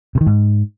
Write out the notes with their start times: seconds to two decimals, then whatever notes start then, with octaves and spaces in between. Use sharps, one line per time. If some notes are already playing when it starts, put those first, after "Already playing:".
0.15 C3
0.21 D#3
0.26 G#2